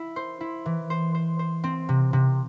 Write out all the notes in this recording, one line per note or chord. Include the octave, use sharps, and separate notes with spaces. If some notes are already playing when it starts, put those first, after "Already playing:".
Already playing: E4
C5
E4
E3
C5
C5
C5
C4
C3
C3